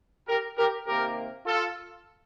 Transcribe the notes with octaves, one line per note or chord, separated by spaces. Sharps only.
G4 A#4
G4 A#4
C3 D#3 A#3 G4 A#4
F4 A4